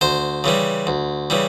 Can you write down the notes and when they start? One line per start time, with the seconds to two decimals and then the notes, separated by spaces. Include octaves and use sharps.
0.01 D2 C5
0.44 C#3 E3 G3
0.87 D2
1.30 C#3 E3 G3